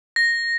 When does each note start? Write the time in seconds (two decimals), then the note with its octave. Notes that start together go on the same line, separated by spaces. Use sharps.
0.16 A#6